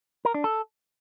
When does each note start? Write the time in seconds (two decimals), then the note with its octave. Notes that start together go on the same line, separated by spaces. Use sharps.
0.25 A#4
0.34 D4
0.44 A4